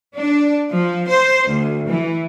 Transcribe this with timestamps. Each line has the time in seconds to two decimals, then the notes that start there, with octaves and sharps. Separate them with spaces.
0.17 D4
0.72 F3
1.08 C5
1.48 D2
1.88 E3